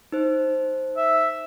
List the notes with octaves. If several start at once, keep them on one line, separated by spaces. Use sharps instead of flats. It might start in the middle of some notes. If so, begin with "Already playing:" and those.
D#4 C5
E5